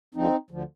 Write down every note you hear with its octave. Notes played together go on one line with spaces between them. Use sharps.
D2 D3 F3 C4 D#4
D2 D3 F3